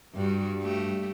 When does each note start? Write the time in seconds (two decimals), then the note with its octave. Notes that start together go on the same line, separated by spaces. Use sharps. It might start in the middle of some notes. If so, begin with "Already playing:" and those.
0.15 G2 G3 F#4
0.62 A3 F#4 G4